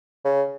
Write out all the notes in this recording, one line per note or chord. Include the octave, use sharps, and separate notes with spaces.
C#3